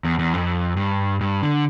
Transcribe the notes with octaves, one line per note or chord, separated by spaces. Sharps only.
E2
E2
F2
G2
G2
D3